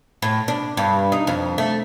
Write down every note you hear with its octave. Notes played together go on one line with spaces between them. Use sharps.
A2
D4
G2
D#4
F2
A3